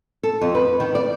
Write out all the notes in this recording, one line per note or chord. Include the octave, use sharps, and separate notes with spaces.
A4
F2
B4
D#3
D5